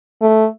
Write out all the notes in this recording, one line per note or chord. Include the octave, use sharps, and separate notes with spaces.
A3